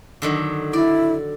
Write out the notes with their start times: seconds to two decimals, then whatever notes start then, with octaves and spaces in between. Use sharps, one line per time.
0.22 D3 D#3 F#3
0.73 E4 D5